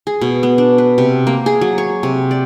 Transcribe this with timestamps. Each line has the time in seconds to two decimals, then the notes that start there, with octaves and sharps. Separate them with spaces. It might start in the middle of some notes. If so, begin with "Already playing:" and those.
0.07 G#4
0.21 B2
0.43 B3
0.58 D4
0.78 B4
0.98 C3
1.27 A#3
1.46 G#4
1.61 F#3
1.78 C#5
2.03 C3
2.31 D5